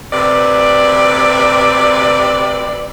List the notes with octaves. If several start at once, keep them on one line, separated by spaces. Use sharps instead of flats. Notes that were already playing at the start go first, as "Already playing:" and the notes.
D2 C3 B4 D5